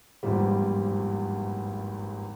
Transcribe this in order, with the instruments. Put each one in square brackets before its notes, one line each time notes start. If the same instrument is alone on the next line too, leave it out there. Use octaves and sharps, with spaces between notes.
[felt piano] G#1 E2 G2 A#2 F3 G3